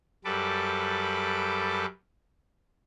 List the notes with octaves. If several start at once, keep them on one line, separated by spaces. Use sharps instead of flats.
F#2 G3 A4 B4 D6